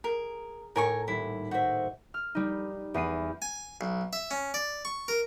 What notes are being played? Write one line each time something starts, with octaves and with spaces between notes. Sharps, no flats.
G#4 A#4
A2 A#4 G#5 C#6
D#1 E4
F#4 C5 D#5 E5 G6
F6
G3 D#4
E2 B3 C7 D#7
G#5
B1
E5
C#4
D5
C#6
A#4